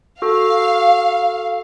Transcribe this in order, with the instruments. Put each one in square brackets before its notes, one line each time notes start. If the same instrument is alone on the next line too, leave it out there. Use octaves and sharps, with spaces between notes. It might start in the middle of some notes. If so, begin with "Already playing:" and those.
[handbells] F#4 A4 [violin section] F5